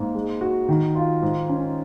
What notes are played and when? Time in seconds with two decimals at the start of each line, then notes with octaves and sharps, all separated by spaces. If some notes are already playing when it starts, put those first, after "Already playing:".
Already playing: G#2 A#3
0.15 G#3
0.41 F#4
0.69 D#3
0.95 F4
1.22 G#2
1.49 C#4